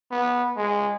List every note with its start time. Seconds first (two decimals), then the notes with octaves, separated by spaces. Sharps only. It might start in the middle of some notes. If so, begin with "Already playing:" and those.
0.11 B3
0.57 G#3